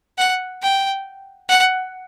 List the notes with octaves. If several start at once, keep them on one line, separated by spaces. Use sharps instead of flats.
F#5
G5
F#5